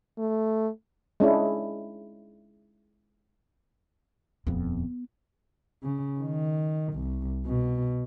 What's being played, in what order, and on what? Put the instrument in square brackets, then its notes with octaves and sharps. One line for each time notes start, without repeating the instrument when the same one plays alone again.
[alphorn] A3
[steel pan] G#3 C#4 D4 E4
[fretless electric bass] D#1 F2 [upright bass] B3
[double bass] C#3
D#3
C2
B2